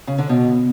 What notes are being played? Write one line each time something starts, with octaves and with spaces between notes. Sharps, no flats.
C#3
D3
B2